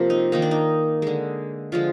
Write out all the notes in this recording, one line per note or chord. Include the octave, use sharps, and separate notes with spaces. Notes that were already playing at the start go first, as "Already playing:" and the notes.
Already playing: C3 F3 A#3
D#4
D#3 A#3 D#4
D4
D#4
D3 G#3
D3 F3 G#3 F4